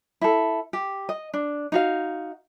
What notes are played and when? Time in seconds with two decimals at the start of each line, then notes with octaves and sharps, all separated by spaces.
0.21 E4 A4
0.73 G4
1.09 D#5
1.34 D4
1.72 D#4 F#4 F5